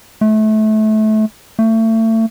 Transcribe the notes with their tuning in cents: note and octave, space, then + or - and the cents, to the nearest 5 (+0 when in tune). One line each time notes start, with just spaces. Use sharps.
A3 -25
A3 +30